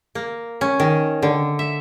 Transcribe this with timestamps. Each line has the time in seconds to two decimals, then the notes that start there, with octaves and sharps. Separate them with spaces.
0.15 A#3
0.61 C#4
0.80 D#3
1.22 D3
1.59 E5